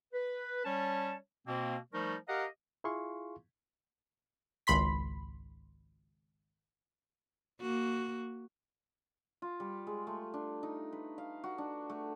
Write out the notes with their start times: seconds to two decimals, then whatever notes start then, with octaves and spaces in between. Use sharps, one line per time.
0.13 B4
0.65 G3 C#4 C#5 A5
1.47 B2 A#3 C4
1.93 F3 G3 A3 D#4 A#4 C#6
2.28 G4 A#4 D#5 F5 F#5 A#5
2.84 E4 F4 G#4 F5 C6 C#6
4.67 G#1 C#2 B5 C6 B6
7.61 A#3 F#4
9.42 F4
9.60 G3
9.87 G#3
10.07 A3
10.34 D4
10.63 D#4
10.93 B4
11.18 F5
11.44 F#4
11.58 D4
11.90 A3